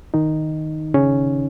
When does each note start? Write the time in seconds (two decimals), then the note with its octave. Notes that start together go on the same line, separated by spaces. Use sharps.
0.14 D#3 D#4
0.94 C#3 C#4